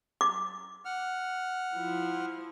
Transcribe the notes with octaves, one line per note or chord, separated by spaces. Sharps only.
D6
F#5 F6
F3 E4